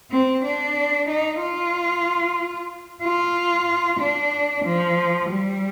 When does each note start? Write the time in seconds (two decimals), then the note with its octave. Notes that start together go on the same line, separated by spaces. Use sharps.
0.11 C4
0.44 D4
1.08 D#4
1.41 F4
3.03 F4
4.00 D4
4.65 F3
5.29 G3